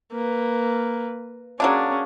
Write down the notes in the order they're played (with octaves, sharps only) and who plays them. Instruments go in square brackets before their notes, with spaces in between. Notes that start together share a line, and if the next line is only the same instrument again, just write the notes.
[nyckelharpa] A#3 B4
[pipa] F#3 A#3 D4 [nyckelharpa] C#4 G#4